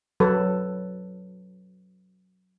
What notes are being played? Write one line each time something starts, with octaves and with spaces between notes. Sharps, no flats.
F#3 A4 B4